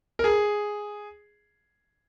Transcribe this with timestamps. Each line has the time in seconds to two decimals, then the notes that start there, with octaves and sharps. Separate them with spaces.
0.19 A#4
0.24 G#4